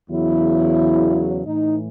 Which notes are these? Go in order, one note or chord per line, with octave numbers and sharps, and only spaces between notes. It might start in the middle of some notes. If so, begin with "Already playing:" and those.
E2 C#3 F#3 E4
A2 E3 D#4